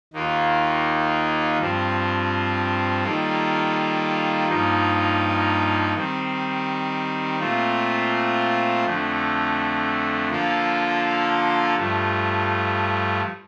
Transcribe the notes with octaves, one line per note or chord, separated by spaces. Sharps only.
D#2 D#3 A#3 F4
G2 F3 C4
D#3 G3 A#3 F4 A4
G2 F3 A#3 D#4
D#3 G3 C4
A#2 A3 C4 F4
F2 D3 A3
D3 F3 A#3 F4 A4
G2 F3 A3